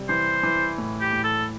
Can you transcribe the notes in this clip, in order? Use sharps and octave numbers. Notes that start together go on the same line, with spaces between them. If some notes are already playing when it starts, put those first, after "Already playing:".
Already playing: C3 G3
E3 C5
E3
A2
G4
A2
A4